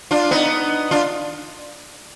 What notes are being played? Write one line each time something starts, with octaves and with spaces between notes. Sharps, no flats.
D4 F4
B3 D#4
D4 F4